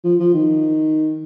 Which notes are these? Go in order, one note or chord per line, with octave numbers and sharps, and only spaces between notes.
F3
F3
D#3